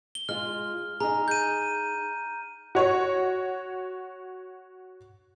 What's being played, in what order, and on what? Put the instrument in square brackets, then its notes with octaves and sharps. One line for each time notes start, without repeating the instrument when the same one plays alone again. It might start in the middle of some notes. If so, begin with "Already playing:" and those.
[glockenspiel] G7
[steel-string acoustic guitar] G#3 F4 [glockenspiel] F6
[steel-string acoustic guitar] D#4 G#4 [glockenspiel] A#5
[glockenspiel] G6 D#7
[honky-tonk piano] F#4 C#5